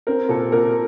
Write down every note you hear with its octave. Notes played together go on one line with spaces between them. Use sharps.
C4 A#4
A#2 A4
A#2 A#4